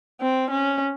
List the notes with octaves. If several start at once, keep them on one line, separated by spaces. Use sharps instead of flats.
C4
C#4